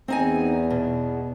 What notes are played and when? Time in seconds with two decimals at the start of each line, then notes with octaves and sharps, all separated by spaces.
0.08 E2 C4 D#4 G#5
0.70 B2